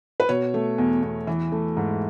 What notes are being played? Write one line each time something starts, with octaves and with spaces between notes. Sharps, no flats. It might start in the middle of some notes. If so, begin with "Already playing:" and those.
B4
B2 C#5
A3
E2
E2
E3
A3
G#2